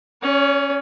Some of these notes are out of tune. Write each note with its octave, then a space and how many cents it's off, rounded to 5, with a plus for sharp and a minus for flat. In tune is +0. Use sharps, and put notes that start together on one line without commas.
C#4 +0 C#5 +45